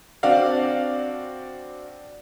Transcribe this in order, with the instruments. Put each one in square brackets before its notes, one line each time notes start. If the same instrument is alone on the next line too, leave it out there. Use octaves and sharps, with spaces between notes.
[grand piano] C4 D4 F#4 D5 F5